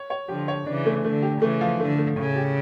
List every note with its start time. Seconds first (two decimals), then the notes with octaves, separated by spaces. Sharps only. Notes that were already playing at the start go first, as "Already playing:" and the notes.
Already playing: C#5
0.10 C#5
0.28 D3 F3 G4
0.48 C#5
0.66 C#3 E3 D4
0.86 A3
1.05 D3 A3
1.22 G4
1.42 C#3 E3 A3
1.61 F3
1.79 D3 A3
1.98 A3
2.17 A2 C#3
2.36 G4